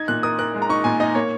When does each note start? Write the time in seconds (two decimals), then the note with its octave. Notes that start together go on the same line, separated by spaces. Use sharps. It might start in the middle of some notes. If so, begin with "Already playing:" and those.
Already playing: D#4 G#6
0.08 A#2 F#6
0.23 A#4 D#6
0.39 A#4 F#6
0.54 G#3
0.62 A#5
0.69 D#4 C#6
0.84 A#2 G#5
1.00 D#4 D#5
1.15 A#3 C#5